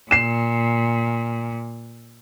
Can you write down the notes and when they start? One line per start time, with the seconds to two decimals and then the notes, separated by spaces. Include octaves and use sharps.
0.11 A#2 C7 E7